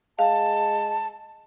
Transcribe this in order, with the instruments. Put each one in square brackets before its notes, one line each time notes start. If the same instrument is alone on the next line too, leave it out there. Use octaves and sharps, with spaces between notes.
[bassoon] G#3 [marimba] F5 [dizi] A5